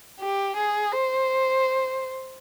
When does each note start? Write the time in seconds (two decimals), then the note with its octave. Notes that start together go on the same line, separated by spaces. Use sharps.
0.20 G4
0.57 G#4
0.93 C5